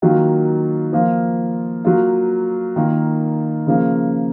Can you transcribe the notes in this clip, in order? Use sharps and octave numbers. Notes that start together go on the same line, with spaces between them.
D#3 F#3 A#3 F4
F3 A#3 F4
F#3 A#3 F4
D#3 A#3 F4
C#3 F3 A#3